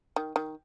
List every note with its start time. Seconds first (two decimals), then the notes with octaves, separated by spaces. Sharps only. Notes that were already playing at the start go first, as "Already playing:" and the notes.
0.16 D#3
0.36 D#3